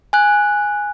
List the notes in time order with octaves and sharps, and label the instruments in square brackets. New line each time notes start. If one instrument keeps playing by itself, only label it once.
[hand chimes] G#5 F#6